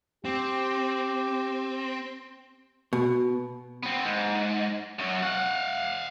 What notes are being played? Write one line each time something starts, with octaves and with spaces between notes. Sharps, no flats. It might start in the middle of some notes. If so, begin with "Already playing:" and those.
C4 G4
B2
B3 C4
G#2
F#2 F#3
F5 F#5